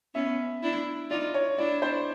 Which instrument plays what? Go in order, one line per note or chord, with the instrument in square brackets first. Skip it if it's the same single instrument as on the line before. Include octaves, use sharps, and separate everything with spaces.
[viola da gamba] B3 C#4 [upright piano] E5
[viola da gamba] D4 E4
[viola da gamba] D#4 F4 [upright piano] D5
[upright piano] C#5
[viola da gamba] D4 E4 [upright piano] D5
[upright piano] C5